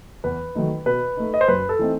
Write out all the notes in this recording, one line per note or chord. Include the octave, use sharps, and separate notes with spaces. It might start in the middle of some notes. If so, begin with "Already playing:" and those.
E2 B4
D#3 F#3 A3 D#4
B2 B4
A3 D#4
D#5
C5
F#2 B4
A4
E3 A3 C4 D#4